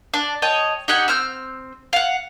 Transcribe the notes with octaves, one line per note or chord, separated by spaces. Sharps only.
D4
C#5 D#5 G5 A5
D#4 G4 F#5 G#5
C4 E6 F6 G6
F5 F#5